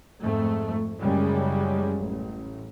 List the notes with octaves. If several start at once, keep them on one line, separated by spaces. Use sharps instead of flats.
F2 G#2 A3
F#1 F#2 C#3 G3 G#3
A1